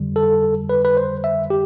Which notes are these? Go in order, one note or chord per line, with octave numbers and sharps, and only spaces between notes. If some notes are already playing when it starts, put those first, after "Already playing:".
Already playing: F2 D3 G3
A4
B4
B4
C5
E5
G4